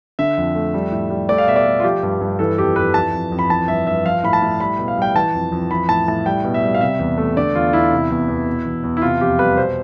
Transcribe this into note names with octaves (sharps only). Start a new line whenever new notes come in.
D3 E5
F2
A3
G3
A2
G3
A3 D5
F5
B2 E5
D5
A3
F4
F3 G4
G2
G2
E3 A4
F2 G4
F2 B4
E3 A5
F2
F2
B5
E3 A5
G2 E5
G2 E5
F3 F5
A2 B5
A5
A2
G3 B5
B2
F5
G3 G5
E3 A5
F2
F2
E3 B5
A2 A5
A2 A5
G3 G5
B2
E5
G3
F5
C3 E5
E2
A3
D3 D5
E2 F4
E2 E4
C3
E2
E2
B2
E2
E2
E4
C3 F4
F2 G4
G3 B4
B2 C5